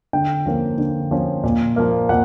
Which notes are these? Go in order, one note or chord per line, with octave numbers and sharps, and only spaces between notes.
D3 G5
F3 A#3 C#4
D3
F3 A#3 C#4
A#2
F3 A#3
A#2 F#5